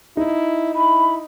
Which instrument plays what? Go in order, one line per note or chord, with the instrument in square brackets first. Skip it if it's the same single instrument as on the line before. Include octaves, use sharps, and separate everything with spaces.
[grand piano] D#4 [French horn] E4
[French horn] E4 [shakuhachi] B5